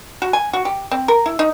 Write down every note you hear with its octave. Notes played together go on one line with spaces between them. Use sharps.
F#4
G#5
F#4
G4
C4
A#4
E4
D#4